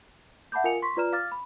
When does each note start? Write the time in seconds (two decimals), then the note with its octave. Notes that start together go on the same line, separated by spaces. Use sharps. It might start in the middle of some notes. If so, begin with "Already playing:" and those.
0.52 E5 F#5 A5 B5 D6 G6
0.64 F4 A#4 F5 G#5 C#7 F7
0.82 C6 C#6 B6
0.97 F4 B4 D5 A#5 F6 E7
1.13 F5 D6 F6 A6
1.32 B5